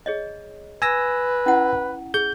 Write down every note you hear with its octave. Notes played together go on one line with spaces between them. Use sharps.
G#4 C#5 D#5
B4 G#5 E6 A#6
C#4 E4 F#5
G#4 G6